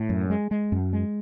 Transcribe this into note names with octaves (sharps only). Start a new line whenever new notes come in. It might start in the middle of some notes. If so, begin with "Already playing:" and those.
Already playing: A2
F#2
G#3
G#3
F#2
G#3